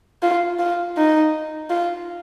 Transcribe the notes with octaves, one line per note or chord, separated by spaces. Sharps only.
F4
F4
D#4
F4